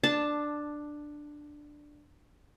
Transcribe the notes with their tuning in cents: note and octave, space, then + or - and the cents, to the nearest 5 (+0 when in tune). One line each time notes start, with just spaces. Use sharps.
D4 +10 A5 +0